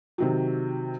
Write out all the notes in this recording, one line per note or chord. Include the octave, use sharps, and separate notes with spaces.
C3 D#3 F#3